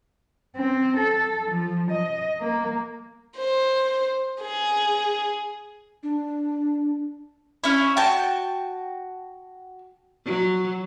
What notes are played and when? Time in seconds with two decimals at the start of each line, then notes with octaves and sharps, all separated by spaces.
0.57 C4
0.97 A4
1.51 F3
1.91 D#5
2.40 A#3
3.36 C5
4.41 G#4
6.03 D4
7.64 C#4 E4
7.97 F#4 G5 A5
10.25 F#3